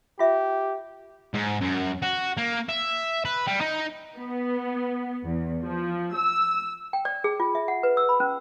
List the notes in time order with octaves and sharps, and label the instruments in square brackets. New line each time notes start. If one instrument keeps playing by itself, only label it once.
[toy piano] F4 E5 [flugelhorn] G4
[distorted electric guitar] G#2
F#2
F#4
A#3
E5
B4
G3
D#4
[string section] B3
E2
F3
E6
[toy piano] G5
D5
G#4
F4
E5
F#5
B4
E6
B5
C#4